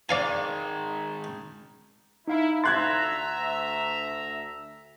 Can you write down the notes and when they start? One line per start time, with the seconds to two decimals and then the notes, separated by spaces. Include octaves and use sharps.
0.09 D#3 G#3 D5 F5 G#5
2.28 D#4 E4 F5 B5
2.64 D2 E5 A#5 C6 F#6 G#6 A6